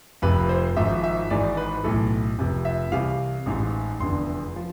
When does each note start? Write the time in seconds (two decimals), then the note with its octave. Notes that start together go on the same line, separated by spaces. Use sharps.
0.22 F1 F2 C3 F3 B4
0.49 C5
0.77 G#1 G#2 F3 E5
1.04 E5
1.30 G#1 G#2 E3 D5
1.57 B4
1.84 B1 A2 E3 A4
2.38 F1 F2 C3
2.65 E5
2.92 C2 C3 E3 F5
3.46 A1 G#2 E3
4.00 F1 E2 D3 C6
4.56 F3